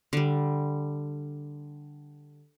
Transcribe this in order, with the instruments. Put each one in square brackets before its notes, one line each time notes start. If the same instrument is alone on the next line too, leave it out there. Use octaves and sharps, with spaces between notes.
[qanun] D3 G3